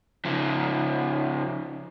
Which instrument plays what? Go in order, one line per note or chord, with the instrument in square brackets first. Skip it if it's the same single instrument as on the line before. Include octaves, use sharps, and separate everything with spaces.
[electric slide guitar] C#3 F3